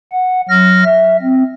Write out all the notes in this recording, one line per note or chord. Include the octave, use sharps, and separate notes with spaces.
F#5
F#3 F6 A#6
E5
C4